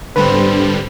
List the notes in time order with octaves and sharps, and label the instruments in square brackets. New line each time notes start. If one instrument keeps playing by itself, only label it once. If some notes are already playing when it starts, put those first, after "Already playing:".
[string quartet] G#2 B3 C4 [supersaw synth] D3 G3 [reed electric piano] B4